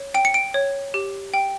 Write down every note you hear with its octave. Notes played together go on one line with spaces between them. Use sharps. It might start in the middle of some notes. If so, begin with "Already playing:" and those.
Already playing: C#5
G5 D7
C#7
D7
C#5
G4
G5